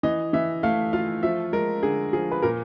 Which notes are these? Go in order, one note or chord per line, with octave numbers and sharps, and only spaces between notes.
E3 D#5
E3 E5
A3 F5
F4 F5
F3 E5
G#3 A#4
D3 G#4
F3 G#4
B4
A#2 A#4